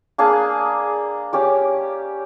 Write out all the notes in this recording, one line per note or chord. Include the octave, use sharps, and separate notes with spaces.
A#3 D4 G#4 A5
C#4 G4 D5